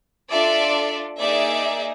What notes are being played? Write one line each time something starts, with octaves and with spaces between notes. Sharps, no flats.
D4 F4 A4 D5 E5
A#3 D#4 G#4 D5 E5